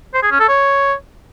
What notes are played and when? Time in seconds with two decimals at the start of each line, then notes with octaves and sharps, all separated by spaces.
0.14 C5
0.23 G#4
0.31 C#4
0.40 A4
0.49 C#5